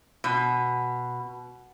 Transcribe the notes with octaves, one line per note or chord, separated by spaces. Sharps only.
B2